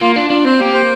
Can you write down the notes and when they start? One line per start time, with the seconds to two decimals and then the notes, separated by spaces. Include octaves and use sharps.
0.01 A#3 F4
0.16 D4 F4
0.30 D4 F4
0.45 C4 C5
0.60 A#3 G4
0.74 C5